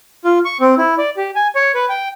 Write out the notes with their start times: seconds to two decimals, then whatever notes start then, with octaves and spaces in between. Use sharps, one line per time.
0.25 F4
0.45 C#6
0.60 C4
0.78 E4
0.98 D5
1.17 G4
1.36 G#5
1.55 C#5
1.75 B4
1.89 G5